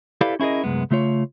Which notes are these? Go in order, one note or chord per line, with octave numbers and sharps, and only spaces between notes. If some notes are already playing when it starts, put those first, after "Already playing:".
E4 G4 A4 B4 D5 F5
C#4 E4 G#4 A#4 D#5
C2 F#2 G#3 B3
C#3 A3 F4 C#5